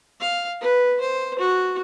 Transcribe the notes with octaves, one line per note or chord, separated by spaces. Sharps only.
F5
B4
C5
F#4